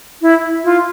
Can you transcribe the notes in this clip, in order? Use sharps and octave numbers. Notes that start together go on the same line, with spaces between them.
E4
F4